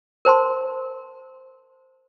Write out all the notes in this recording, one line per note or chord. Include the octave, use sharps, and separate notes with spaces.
A#4 C5 A5 C6